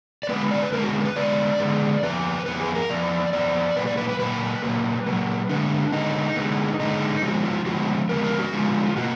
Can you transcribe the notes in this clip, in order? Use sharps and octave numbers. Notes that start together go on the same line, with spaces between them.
D5
D3 G#3 B3 B4
D5
B4
D3 G#3 B3 A#4
F#4
G#4
A#4
B4
D3 G#3 B3 D5
D3 G#3 B3
F2 F3 B3 B4
F2 F3 B3 B4
G#4
A#4
F2 F3 B3 D5
F2 F3 B3 D5
A#2 F#3 A#3 B4
D5
B4
B4
A#2 F#3 A#3 B4
A#2 F#3 A#3
A#2 F#3 A#3
D3 G#3 B3 D4
D3 G#3 B3 D#4
D3 G#3 B3
D3 G#3 B3 D#4
D3 F3 G#3 B3 F#4
F4
D3 F3 G#3 B3 F#4
D3 F3 G#3 B3 A#4
A#4
F#4
D3 F3 G#3 B3 F4
B2 A#3 F#4